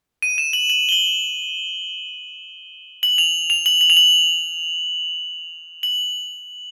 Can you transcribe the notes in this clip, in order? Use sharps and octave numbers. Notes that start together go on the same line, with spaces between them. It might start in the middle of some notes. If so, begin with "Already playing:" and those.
D#7
E7
F#7
F#7
G7
F#7
F#7
F7
F7
F#7
F#7
F7
F#7
F#7